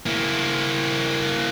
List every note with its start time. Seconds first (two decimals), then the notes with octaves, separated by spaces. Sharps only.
0.06 A#3 E4